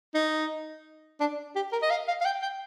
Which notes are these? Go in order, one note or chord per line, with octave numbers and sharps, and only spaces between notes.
D#4
D4
G4
A#4
D#5
F5
F5
F5
G5
G5